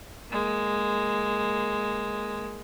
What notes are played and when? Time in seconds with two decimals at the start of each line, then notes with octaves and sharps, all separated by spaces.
0.30 G#3 A#3